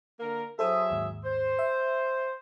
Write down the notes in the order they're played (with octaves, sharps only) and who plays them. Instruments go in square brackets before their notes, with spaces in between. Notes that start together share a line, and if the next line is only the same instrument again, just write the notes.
[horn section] D3 A#3 A#4
[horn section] F#3 G#4 E5 [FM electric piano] A4 C5 D#6
[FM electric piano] D#2 G#2
[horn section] C5
[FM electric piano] E5